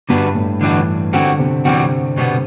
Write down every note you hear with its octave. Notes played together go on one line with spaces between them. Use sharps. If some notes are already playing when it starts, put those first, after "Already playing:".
G2 D3 G3 D4 F#4 B4
A2
D3 E3 G3 D4 F#4 B4
D3 E3 G3 C4 F#4
C3
C3 E3 G3 C4 F#4
B2 G3 B3